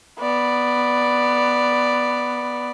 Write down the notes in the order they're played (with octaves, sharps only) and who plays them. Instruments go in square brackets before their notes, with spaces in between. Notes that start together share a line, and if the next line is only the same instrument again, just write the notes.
[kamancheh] B3 D5